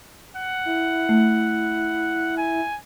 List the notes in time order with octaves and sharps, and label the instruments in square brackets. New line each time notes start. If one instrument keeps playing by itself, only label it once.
[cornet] F#5
[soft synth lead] E4
[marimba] A3
[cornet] G#5